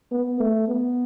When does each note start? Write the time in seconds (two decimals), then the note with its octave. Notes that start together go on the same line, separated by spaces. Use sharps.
0.12 B3
0.40 A3
0.68 B3